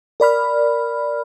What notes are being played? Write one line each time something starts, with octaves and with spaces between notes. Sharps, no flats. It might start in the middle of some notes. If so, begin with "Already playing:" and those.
A#4 D5 B5 F6